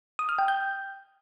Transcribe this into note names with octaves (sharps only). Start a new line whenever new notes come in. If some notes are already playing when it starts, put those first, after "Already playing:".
D#6
F6
G5
G6